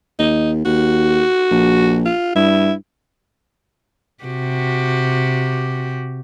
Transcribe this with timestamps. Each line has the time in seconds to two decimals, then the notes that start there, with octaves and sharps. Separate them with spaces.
0.19 D#2 D#4
0.65 D#2 F#4
1.51 A#1
2.06 F4
2.36 G2 E4
4.24 C3 F#4 G4